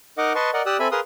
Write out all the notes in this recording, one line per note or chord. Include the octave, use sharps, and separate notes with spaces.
D#4 A#4 D#5 F#5 D6
B4 D#5 A5 C6 C#6
A#4 D5 D#5 F#5
G4 D5 D#6 E6 F#6
C4 A4 E5 G#5 B5
G#4 A#4 B4 F5 C6 D#6